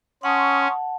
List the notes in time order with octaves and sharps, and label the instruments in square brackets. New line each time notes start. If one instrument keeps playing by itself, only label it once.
[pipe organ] C#4 [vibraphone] F#5 A5 [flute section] C6 C#6 D#6